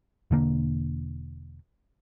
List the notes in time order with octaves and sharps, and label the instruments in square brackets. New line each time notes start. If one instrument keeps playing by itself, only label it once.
[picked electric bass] E1 D3 A#3